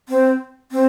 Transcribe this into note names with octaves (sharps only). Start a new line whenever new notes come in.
C4
C4